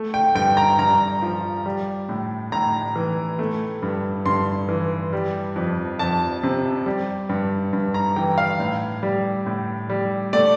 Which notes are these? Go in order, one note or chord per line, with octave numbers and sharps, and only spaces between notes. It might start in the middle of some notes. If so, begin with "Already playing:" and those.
Already playing: A3
G5
G2 G5
A#5
G2 A#5
F3
G3
A2
A2 A#5
E3
A3
G2
G2 C6
E3
G3
F2
F2 A5
C3
G3
G2
G2
A#5
E3 G5
F5
A2
G3
A2
G3
A3 D5